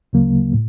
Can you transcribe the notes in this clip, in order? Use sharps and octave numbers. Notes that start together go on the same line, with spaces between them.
D2 C#3 F#3 A#3
A2